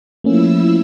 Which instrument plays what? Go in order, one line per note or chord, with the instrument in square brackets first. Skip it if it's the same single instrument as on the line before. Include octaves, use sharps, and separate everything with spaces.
[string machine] F3 E4 E6 [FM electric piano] A3 A#3 C#4